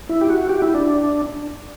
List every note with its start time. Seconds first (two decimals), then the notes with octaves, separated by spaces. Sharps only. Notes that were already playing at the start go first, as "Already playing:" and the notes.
0.09 E4
0.21 G4
0.29 F#4
0.50 G4
0.62 E4
0.75 D4